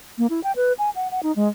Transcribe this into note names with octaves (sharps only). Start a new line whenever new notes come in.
A#3
E4
G5
B4
G#5
F#5
F#5
D#4
G#3